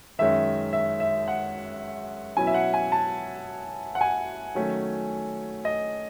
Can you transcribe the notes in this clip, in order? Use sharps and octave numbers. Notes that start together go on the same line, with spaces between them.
F#2 D#3 G#3 C#4 E5
E5
E5
F#5
B2 F#3 C#4 E4 G#5
E5
F#5
G#5
A5
F#5
G#5
D#3 F#3 A3 C#4
D#5